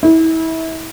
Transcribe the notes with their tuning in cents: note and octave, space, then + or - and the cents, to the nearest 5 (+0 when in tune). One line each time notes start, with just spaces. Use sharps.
E4 -30